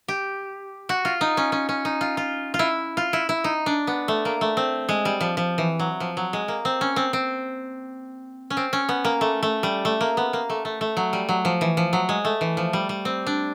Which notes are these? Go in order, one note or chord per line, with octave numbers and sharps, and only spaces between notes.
G4
F#4
F4
D#4
C#4
C#4
C#4
D#4
F4
F4
F4
E4
F4
E4
E4
D#4
D4
B3
A3
A#3
A3
C4
G#3
G3
F3
F3
E3
F#3
F3
F#3
G#3
A#3
C4
C#4
C4
C4
C#4
C4
C#4
B3
A#3
A3
A3
G3
A3
A#3
B3
A#3
A3
A3
A3
F#3
G3
F#3
F3
E3
F3
F#3
G#3
A3
E3
F3
G3
G3
C4
D4